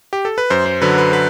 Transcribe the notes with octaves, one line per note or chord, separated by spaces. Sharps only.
G4
A4
B4
F#2 C5
C5
D3 F#3 B4
B4
B4